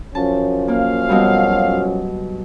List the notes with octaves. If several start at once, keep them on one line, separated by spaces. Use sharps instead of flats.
F#2 F3 C#4 A5
A#3 F5
B2 F#3 G3